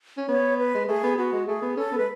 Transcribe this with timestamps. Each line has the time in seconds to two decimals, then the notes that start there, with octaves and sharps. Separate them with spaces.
0.17 C#4
0.28 B3 C#5
0.58 B4
0.74 G#3
0.87 A3 G#4
1.03 B3
1.17 B3 F#4
1.32 G#3
1.47 A3 G#4
1.62 B3
1.77 C#4 A4
1.92 B3
1.98 G#3 B4